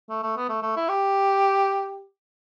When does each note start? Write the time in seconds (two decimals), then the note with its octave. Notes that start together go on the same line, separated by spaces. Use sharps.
0.09 A3
0.23 A3
0.37 B3
0.49 A3
0.62 A3
0.76 E4
0.89 G4